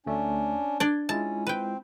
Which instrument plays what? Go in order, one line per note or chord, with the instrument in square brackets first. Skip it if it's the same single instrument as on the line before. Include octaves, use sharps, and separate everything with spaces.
[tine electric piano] D2 A3 [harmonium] C#4 D4
[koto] D4 D5 [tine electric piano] G#6
[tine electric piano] G#3 E4 F4 [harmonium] C#4 [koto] A5
[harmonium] C4 [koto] B4 G5